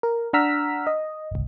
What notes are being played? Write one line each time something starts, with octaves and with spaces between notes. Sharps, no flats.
A#4
D4 F#5 A#5 E6 F6 B6
D#5
G1 C2